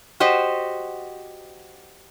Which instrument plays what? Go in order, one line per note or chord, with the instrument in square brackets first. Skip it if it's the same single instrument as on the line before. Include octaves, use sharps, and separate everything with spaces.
[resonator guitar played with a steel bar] F#4 G4 C5 D#5